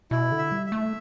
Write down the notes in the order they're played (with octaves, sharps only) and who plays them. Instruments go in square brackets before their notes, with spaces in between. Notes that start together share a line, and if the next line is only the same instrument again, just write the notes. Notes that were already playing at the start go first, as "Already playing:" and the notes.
[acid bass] B2 [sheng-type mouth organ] E4
[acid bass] D3
[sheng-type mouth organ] E5
[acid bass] G3
[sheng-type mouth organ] E5
[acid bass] A3